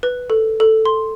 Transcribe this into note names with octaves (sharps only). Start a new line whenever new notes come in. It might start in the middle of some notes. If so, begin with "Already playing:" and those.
B4
A4
A4
C6